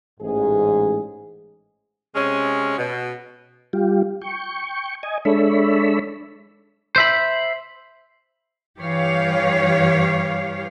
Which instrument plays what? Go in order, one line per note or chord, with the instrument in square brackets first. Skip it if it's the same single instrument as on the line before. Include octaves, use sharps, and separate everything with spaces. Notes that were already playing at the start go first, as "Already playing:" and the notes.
[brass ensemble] A1 G#2 G#4
[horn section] C3 G#3 C#4
B2
[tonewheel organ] G3 F4 G4
G5 C#6
D#5 G#5
G#3 D4 A4 C#5 E5 B5
[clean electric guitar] C5 E5 B5
[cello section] G2 E3 G4 B4 C#5 F5